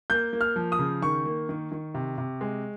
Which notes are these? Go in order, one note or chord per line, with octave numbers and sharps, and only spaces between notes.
A#3 G6
A#3
F6
F3
D#6
C#3
D#3 C#6
A#3
D#3
D#3
C3
C3
G#3